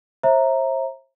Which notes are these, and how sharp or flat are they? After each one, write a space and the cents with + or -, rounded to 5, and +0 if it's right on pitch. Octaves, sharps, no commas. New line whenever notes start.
C5 +40 E5 +0 A#5 +0